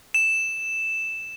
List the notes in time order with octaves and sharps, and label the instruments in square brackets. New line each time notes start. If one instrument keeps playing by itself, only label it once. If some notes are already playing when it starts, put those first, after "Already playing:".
[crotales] E7